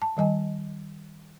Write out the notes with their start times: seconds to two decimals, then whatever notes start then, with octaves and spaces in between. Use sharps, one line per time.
0.02 A5
0.17 D#3 G3 D#5 G#5